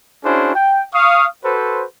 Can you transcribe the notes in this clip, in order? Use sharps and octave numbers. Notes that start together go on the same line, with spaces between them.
C#4 D4 E4 F#4 G#4 C5
G5
F5 C#6 D#6
F#4 A4 B4 C5